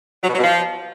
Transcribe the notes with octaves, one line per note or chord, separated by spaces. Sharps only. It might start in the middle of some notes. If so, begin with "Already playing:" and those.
F#3
B2
F#3
B2
F3